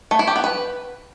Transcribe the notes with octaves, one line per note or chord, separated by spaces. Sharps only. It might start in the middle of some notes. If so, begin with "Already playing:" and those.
A3
E4
G4
B3
B4